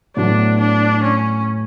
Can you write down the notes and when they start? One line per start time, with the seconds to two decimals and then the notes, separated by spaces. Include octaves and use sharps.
0.16 A2 F#3 B3 D4
0.60 D4
1.03 C#4